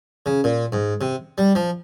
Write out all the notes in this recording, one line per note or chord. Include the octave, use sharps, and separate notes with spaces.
C#3
A#2
G#2
C3
G3
F3